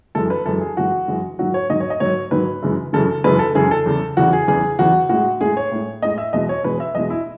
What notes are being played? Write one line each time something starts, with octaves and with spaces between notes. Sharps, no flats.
F#2 E3 G#3 A4
B4
F#2 E3 G#3 A4
G#4
F#2 E3 G#3 F#4
F#2 E3 G#3
G#2 D#3 F#3 F#4
C#5
G#2 D#3 F#3 D#5
C#5
D#5
G#2 D#3 F#3 C#5
G#2 D#3 F#3 B4
F#2 C#3 E3 G#3
F#2 C#3 E3 G#3 A4
F#2 C#3 E3 G#3 B4
A4
F#2 C#3 E3 G#3 G#4
A4
E2 C#3 E3
E2 C#3 E3 F#4
G#4
E2 C#3 E3 G#4
E2 C#3 E3 F#4
A2 G#3 F#4
A2 G#3 G#4
C#5
A2 G#3
A2 G#3 D#5
E5
E2 B2 G#3 D#5
C#5
E2 B2 G#3 B4
E5
E2 B2 G#3 D#5
E4